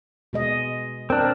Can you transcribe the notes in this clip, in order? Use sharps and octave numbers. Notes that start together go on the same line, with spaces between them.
B2 G#3 D#5
C4 D4 A#4